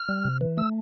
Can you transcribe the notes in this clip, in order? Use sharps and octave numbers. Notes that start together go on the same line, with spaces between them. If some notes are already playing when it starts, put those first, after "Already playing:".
Already playing: F6
G3
C3
E3
A3 E6